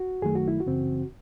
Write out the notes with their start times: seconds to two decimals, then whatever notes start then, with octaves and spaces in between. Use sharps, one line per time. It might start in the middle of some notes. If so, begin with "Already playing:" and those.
Already playing: F#4
0.22 F#2 D#3 F#3 A3 G#4
0.35 F#4
0.48 E4
0.60 F#4
0.66 F#2 C#3 E3 C4